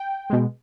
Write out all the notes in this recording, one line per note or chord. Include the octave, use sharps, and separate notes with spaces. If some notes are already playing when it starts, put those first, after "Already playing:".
Already playing: G5
B2 G#3